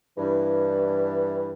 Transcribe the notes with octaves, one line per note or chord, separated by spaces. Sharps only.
G2 E3